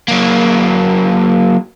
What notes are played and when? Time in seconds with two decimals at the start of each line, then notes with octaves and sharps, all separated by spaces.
0.08 F#3 A#3